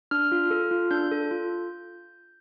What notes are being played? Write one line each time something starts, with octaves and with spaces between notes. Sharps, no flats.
D4 F6
F4
A4
F4
D4 G6
A4
F4